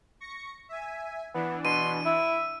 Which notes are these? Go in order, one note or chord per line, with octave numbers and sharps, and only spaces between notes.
C#6 A#6 C#7
E5 G#5
E3 B3 D4
B2 C6 D#7
E4 E5